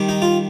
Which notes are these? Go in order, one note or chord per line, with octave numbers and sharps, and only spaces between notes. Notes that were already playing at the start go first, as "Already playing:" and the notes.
Already playing: D#3 G3
D#4
F4